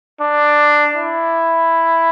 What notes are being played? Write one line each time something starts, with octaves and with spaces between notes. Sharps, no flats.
D4
E4